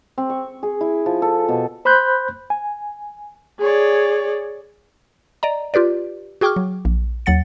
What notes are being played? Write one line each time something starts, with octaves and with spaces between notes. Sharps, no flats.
C4
C#6
G#4
E4
F3
A4
B2
C5 B5 C6 F#6 G6
G#5
G#4 C#5 D5
D5 D#5 A#5
F4 G4 B4 D5
F#4 G#4 G5 C#6 D6 F6
F#3
A#1
D#2 F#3 F#5 A6 C#7